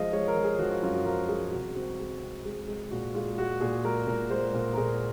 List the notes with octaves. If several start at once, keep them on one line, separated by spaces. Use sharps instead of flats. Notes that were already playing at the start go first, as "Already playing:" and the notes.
Already playing: F3 G#3 D#5 F5
G#3 C#5
A#4
F3
G#4
F3 F#4
F4
F#2 F4
F#4
F3 A#4
G#3 G#4
C2 F#4
C4 F#4
G#3
C4
G#3
G#3
A#2 F#4
G#3 F4
G#3 F#4
A#2 G#4
G#3 A#4
A#2 A#4
G#3 C5
A#2 A#4
A#4
A#2 G#4